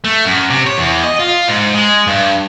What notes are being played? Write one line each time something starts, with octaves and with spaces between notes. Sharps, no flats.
A3
F#2
C3
C#5
E2
D#5
F4
G#2
G#3
G2